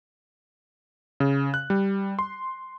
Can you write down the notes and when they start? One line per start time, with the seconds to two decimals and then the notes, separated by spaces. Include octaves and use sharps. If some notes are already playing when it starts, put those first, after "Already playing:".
1.20 C#3
1.54 F#6
1.70 G3
2.19 C6